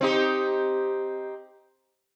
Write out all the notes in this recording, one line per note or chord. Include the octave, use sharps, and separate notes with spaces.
C4 D#4 G4